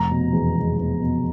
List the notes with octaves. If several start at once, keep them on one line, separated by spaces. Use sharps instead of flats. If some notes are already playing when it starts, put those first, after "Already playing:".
Already playing: F1 A#5
B2
E2
G#3
E2
B2